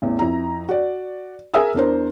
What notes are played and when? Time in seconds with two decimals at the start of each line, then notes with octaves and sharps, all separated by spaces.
0.02 A1 E2
0.19 F2 E4 A#5
0.69 F#4 D5
1.54 G#4 A#4 E5 G#5 D#6 E6
1.74 E2 D4 A#4 C5